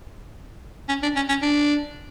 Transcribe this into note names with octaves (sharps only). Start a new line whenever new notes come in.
C#4
D4
C#4
C#4
D4